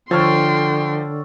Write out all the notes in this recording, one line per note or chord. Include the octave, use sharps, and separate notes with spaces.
D3 F3 A4 C#5 G5 C6 F6